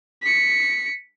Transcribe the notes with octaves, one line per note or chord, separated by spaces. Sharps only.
B6 C#7